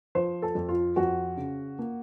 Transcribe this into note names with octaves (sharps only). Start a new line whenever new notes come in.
F3 C5
A4
F2
F4
F2 F#4
C#3
A#3